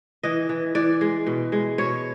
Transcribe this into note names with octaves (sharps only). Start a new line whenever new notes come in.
E3 D#5
E3
E3 D5
G#3
B2
G#3
B2 C#5